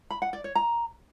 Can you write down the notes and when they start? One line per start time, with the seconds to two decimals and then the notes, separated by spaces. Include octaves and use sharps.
0.10 B5
0.22 F#5
0.33 D5
0.44 C#5
0.55 A#5